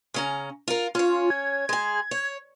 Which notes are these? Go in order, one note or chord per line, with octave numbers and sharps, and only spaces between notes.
C#3 C#4 A#5
F4 A#4
C#4 F4 C#5
G#6
G#3 G#4
C#5